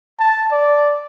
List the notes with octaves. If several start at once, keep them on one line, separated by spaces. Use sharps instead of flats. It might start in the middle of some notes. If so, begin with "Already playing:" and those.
A5
D5